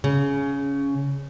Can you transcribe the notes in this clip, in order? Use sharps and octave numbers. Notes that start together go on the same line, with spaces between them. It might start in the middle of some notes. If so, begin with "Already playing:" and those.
C#3